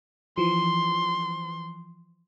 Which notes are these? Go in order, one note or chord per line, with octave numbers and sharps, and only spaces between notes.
E3 F3 C6